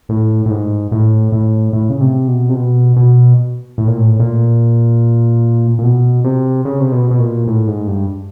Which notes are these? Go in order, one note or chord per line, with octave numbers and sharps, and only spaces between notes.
A2
A2
G#2
A2
A2
A2
C#3
C3
B2
C3
B2
B2
A2
A#2
A2
A#2
A#2
B2
C3
C#3
C3
B2
B2
A#2
A2
G#2
G2